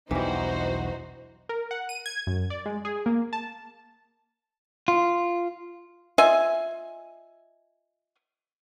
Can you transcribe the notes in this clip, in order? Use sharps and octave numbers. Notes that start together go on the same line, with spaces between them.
B1 E2 E3 G3 D4 D#4 F#4 C5
A#4
F#5
D#7
G#6
F#2
D5
G#3
G#4
A#3
A5
F4
F4 D#5 E5 G#5